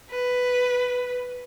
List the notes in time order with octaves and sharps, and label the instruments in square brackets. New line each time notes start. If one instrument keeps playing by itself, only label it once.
[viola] B4